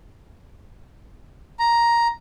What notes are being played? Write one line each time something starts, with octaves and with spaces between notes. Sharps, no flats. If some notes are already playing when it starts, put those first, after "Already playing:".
A#5